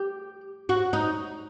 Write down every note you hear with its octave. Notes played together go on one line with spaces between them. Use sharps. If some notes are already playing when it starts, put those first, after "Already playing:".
Already playing: G4
F#4
D#4